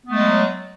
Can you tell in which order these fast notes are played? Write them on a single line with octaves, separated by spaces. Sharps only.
B3 A3 G#3 F#3